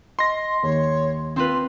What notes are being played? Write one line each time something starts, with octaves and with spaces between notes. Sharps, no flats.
D#5 C6 A#6
D#2 C#5
C4 F4 B4 C6